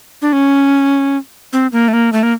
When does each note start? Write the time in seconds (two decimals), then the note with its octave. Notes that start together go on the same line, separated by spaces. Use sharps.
0.22 D4
0.33 C#4
1.53 C4
1.72 A#3
1.88 A3
1.93 A#3
2.13 A3
2.23 A#3